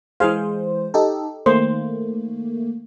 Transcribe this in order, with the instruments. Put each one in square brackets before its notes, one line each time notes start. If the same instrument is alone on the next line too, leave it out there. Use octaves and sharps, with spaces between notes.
[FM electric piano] E3 G#3 C5 [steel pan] G#4 F5
[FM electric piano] D#4 G4 A4
[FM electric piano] D#3 A3 A#3 [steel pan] C5